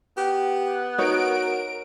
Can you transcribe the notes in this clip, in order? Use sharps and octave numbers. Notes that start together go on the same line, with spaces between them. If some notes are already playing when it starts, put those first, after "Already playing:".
B3 G4
D#4 F#4 A#4 C#5 D7